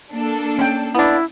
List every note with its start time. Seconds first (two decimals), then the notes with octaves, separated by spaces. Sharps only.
0.12 A#3 D4 A4
0.59 C#4 G5
0.95 B3 D4 E4